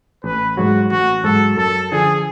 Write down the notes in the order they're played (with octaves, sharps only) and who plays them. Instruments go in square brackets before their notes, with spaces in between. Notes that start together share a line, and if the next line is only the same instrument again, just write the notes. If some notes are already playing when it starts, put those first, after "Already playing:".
[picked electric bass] A1 [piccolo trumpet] B4
[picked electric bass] G#2 F#3 [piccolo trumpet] F#4
[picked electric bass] A1 [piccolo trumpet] F#4
[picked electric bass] G#2 F#3 [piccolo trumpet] A4
[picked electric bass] F#2 [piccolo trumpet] A4
[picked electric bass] D3 F3 [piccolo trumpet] G#4